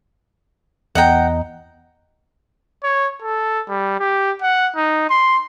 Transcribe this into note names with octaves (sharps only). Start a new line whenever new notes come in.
E2 D#5 F#5 G5 A#5
C#5
A4
G3
G4
F#5
D#4
C6